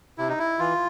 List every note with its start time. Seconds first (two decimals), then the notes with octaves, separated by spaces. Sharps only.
0.18 C3 E4
0.28 D#4
0.39 E4
0.59 E3 F4